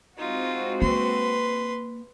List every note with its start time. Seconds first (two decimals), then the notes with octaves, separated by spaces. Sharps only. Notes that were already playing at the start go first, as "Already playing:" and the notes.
0.18 G#3 C4 D#4 F4 F#4
0.82 A#3 B4 C6